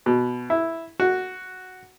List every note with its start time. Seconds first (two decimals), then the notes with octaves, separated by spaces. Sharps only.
0.06 B2
0.50 E4
1.00 F#4